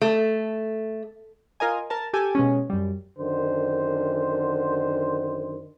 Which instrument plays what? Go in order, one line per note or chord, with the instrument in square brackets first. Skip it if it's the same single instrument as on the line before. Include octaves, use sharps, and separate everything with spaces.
[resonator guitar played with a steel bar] A3
[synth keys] F4 A#4 D#5 G#5
A#4 A5
G4 A4 G#5
B2 G#3 C#4
F#2 G3
[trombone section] F#2 D3 D#3 C5